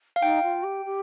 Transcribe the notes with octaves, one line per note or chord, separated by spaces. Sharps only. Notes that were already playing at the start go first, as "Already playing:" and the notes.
F5
D#4 G5
F4
G4
G4